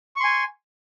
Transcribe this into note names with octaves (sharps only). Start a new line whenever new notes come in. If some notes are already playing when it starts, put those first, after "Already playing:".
G#5 C6 C#6